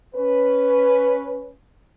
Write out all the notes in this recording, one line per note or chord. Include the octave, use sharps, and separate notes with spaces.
C#4 B4